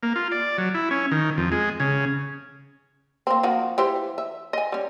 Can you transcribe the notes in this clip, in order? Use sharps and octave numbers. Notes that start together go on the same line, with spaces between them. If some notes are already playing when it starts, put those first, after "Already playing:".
A#3
F4
D5
F#3
E4
C#4
D#3
F2
G#3
C#3
A#3 C4
F3 A#3 F#4
E3 G4 C5
E5
D#5 G#5
G3 C#4